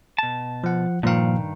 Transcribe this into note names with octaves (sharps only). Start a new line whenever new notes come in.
B2 A5
F3 F#5
G2 A#2 D#3 F3 F5